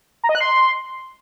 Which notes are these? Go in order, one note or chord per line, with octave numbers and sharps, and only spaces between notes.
A#5
D#5
F#6
C6